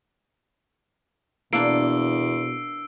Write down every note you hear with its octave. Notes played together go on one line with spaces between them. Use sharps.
E2 B2 A#3 D4 E6 C7 D7